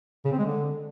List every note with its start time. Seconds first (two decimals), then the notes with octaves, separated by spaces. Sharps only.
0.25 C#3
0.32 C4
0.38 G#3
0.45 D3